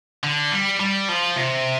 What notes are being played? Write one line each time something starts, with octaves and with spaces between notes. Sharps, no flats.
D3
G3
G3
F3
C3